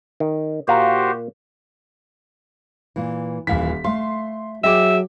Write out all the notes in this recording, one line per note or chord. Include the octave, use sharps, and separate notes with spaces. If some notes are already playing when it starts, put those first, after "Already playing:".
D#3
A#2 F#4 G4 C5 F5 A#5
A#2 E3
D#1 A#2 E3 F5 B6
A3 F5 C6
F#3 G#4 D#5 E5 G5 D6